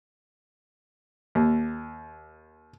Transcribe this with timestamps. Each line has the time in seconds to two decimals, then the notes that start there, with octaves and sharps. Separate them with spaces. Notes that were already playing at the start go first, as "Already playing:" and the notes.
1.35 D#2